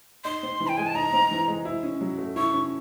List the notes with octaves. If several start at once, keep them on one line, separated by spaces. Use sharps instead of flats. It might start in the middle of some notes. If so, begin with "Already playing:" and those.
D#4 C6
C4
E3
G5
G#3 G#5
A5
D#4 A#5
C4
E3
G#3
E4
C#4
F#3
A3
E4 C#6
C#4